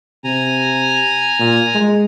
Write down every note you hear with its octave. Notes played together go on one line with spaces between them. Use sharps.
C3 G#5 A#5
A#2
G#3